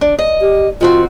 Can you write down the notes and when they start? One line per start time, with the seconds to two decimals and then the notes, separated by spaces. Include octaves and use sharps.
0.01 D4
0.19 D#5
0.41 G4
0.81 D#3 C4 F4 F#4